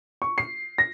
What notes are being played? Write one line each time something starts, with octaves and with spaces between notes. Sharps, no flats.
C#6
C7
A#6